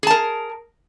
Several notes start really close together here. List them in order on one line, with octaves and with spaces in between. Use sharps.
G#4 A5 A#4